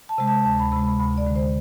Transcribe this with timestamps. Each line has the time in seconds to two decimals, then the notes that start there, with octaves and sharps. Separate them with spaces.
0.09 A5
0.18 C3 G#3
0.27 A5
0.45 D2 A5
0.59 B5
0.72 C3 G#3 B5
0.86 B5
1.00 D2 B5
1.18 D5
1.26 D3 G#3
1.36 C5